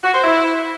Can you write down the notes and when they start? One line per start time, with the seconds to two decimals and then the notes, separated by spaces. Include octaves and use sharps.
0.04 F#4
0.14 C5
0.24 E4